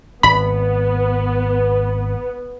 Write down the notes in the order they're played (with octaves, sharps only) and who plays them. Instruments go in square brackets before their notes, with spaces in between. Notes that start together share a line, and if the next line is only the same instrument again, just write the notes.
[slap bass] G#1 [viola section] B3 [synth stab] B5